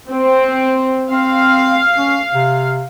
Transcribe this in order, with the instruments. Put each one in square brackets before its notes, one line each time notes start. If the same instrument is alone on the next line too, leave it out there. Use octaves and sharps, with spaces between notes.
[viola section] C4
[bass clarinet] C4 [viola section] F5
[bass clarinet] C#4
C3